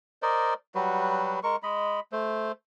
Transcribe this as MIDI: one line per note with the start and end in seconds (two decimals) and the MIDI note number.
0.22 0.54 70
0.22 0.54 72
0.22 0.54 74
0.22 0.54 75
0.75 1.40 54
0.75 1.40 55
0.75 1.40 66
0.75 1.40 71
1.43 1.56 56
1.43 1.56 70
1.43 1.56 85
1.63 2.00 56
1.63 2.00 75
1.63 2.00 83
2.12 2.52 57
2.12 2.52 72